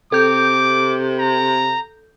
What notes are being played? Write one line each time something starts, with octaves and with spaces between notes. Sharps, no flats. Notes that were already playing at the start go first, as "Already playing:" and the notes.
C3 A4 D6 G6
A#5